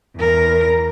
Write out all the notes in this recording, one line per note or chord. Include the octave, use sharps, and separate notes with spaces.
E2 A#4